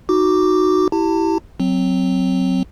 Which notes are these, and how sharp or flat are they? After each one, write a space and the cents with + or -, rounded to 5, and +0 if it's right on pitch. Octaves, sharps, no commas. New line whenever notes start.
D#4 +5 F#4 +0 D6 +0
E4 +0 G4 -20 A5 +35
F#3 +0 C4 +0